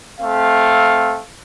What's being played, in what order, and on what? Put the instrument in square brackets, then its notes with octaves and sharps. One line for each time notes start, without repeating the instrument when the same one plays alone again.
[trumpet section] A3 C4 F5